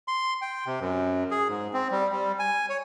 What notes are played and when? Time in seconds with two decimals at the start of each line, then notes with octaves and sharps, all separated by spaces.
0.08 C6
0.41 G5
0.66 C3
0.80 F#2
1.31 G#4
1.48 G#2
1.74 C4
1.91 G3
2.12 G3
2.39 G#5
2.70 C#5